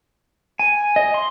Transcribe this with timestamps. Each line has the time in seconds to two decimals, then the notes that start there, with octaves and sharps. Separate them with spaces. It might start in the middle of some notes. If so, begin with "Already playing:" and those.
0.59 G#5
0.96 D#5
1.14 C6